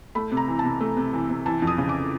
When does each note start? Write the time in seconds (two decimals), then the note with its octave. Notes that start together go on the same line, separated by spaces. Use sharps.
0.15 A3 B5
0.32 C3
0.37 A#5
0.48 E3
0.59 A5
0.65 C3
0.81 A3
0.97 C3
1.13 E3
1.29 C3
1.46 E3 A5
1.62 F2
1.67 D#6
1.78 C#3
1.89 D6